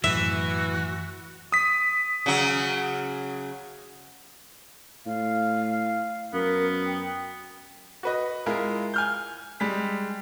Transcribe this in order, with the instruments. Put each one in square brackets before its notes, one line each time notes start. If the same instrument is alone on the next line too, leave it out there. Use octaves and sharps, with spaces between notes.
[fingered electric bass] F#2 A2 [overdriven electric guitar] E3 [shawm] F#4 [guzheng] E5
[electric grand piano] D#6 B6
[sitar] C#3 F#3
[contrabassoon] A2 [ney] F5
[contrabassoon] F#2 [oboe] B3 [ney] A#4
[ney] G5
[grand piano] F#4 B4 D#5
G#3 E4 F4 A#4
G#5 F6 G6
G3 G#3 B6